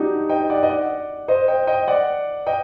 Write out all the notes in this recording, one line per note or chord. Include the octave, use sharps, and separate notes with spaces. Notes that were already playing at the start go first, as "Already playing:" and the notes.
Already playing: D4 D#4 F#4 G4
D#5 G5
D5 F#5
D#5
D5 F#5
C5 D#5
D#5 G5
D#5 G5
D5 F#5
D#5 G5